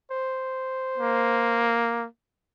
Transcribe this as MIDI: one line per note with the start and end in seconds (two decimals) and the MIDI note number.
0.11 1.78 72
0.98 2.07 58